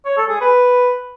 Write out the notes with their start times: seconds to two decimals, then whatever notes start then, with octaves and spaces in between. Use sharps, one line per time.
0.05 C#5
0.17 A4
0.29 G#4
0.41 B4